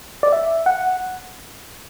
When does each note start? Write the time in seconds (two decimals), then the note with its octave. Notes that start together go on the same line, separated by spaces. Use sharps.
0.23 D5
0.32 E5
0.66 F#5